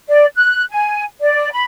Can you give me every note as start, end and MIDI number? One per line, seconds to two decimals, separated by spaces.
0.08 0.26 74
0.35 0.63 90
0.70 1.03 80
1.20 1.47 74
1.52 1.64 83